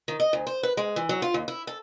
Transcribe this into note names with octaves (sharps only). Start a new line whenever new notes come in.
D#3
D#5
D2
C5
B4
G#3
E3
F#3
F4
D#2
E4
A4